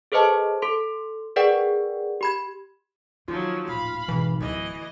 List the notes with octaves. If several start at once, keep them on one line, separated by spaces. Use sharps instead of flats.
G#4 A4 B4 C5 D#5 A5
A4 C6
G#4 A#4 B4 D5 F#5 G5
G4 B5 G#6
D#3 F3 F#3 F4
D#1 A2 F5 B5
G#1 B2 E3
D1 D2 E3 D#5